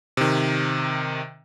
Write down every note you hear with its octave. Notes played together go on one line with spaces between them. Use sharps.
C3 D#3